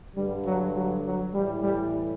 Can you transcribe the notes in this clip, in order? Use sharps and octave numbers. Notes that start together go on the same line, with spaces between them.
G2 D3 G3
F#3
F#3
F#3
A2 E3 G3
G3